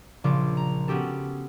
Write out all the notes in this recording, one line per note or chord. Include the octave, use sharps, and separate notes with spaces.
A#1 C#3 F4 D6
A#5
B3 C#4 F#4 G4 A4